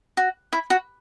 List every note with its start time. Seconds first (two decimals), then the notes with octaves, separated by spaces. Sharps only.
0.17 F#4
0.53 E4
0.70 F#4